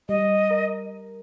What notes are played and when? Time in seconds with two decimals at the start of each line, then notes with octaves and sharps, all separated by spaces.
0.09 G3 D#5
0.51 A#4